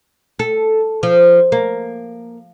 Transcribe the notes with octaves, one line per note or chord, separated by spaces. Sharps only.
A4
F3
A#3